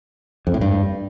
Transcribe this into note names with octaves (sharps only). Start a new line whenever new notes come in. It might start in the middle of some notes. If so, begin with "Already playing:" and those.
F2
A2
G2